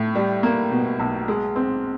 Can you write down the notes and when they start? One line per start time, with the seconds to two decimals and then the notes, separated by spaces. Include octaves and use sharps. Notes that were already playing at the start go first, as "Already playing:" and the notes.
Already playing: A2
0.15 G3
0.43 A#3
0.71 B2
0.99 B1
1.28 G#3
1.56 C4